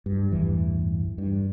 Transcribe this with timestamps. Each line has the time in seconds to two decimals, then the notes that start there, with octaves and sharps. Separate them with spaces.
0.06 G2
0.32 A1 E2 G2 E3
1.18 G2